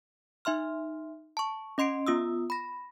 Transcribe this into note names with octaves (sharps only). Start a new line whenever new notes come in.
D#4 E5 C6 F6
A5 C#6
C#4 D#5 C6 C7 D7
B3 F4 D#6 E6
B5 A#6